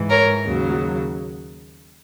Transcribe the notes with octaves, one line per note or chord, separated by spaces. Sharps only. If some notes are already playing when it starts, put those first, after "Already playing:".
Already playing: G#2 E3
A#4 C#5
D#2 C#3 F#3